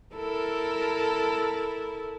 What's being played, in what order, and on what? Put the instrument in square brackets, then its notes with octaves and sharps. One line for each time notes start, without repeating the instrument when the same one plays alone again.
[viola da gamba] E4 A4 A#4